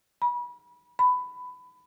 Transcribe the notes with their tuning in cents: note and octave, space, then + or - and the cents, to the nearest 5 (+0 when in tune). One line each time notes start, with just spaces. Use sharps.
B5 -30
B5 +15